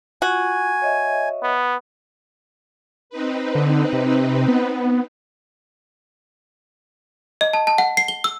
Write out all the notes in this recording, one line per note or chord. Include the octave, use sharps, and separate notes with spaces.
F4 F#4 G#5
C#5 D#5 E5
B3
C4 D#4 B4
D3
C3
B3
D#5
A5
A5
F#5
C7
G7
E6